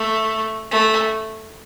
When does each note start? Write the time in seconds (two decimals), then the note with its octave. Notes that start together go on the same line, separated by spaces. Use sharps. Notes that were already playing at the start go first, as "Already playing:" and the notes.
Already playing: A3
0.71 A3